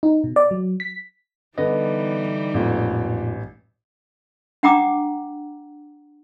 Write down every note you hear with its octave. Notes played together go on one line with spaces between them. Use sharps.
D#4
B2
D5
F#3
B6
D3 E3 G3 B3 D#4 D#5
A1 F2 A#2
D4 F#5 G5 A#5 D6 D#6